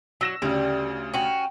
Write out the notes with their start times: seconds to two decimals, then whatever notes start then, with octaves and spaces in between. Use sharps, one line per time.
0.21 F#3 E6 A#6 E7
0.42 D2 C#3 G3
1.14 C#4 F#4 G5